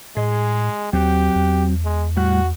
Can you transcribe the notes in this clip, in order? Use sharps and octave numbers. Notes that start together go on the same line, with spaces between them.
A2 G#3 G#4 D#5
D#2 F#3 C4 F#4 G4
E2
G#3
A2 G3 F#4 F#5